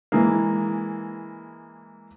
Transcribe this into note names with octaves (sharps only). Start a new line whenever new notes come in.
E3 G#3 A#3